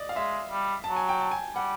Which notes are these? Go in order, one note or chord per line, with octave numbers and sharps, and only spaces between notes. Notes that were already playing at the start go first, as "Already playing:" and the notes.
Already playing: D5 D#5
F5
G#3 E5
G3
F#3 A5
G#5
G5
A5
G#5
G3 F#5